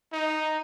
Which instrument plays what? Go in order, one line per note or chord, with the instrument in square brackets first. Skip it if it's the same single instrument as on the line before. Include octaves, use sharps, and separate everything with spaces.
[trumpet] D#4